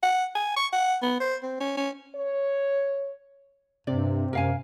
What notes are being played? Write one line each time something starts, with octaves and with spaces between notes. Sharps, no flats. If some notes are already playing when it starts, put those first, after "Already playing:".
F#5
G#5
C#6
F#5
B3
C5
C4
C#4
C#4
C#5
G2 C3 D5
F#2 A#4 F5 G#5